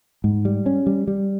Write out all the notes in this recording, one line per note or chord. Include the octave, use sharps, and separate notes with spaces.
G#2
G3
C#4
G3
G3